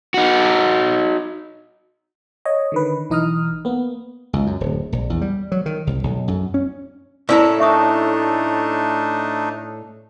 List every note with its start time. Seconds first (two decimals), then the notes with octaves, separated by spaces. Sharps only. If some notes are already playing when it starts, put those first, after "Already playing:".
0.14 D#4 F#4
2.45 C#5 D#5
2.72 D3 D#3 B4
3.10 B1 E3 D#4 D#5 D#6 F6
3.65 A#3 B3
4.33 C#2
4.47 F#2
4.60 D1
4.92 A#1
5.10 E2
5.21 G3
5.52 F#3
5.66 D#3
5.87 C2
6.03 B1
6.28 F#2
6.54 C#4
7.29 A2 C#4 E4 A4 A#4 D5 A#5
7.60 A3 D4 D#4 E5 C#6 D#6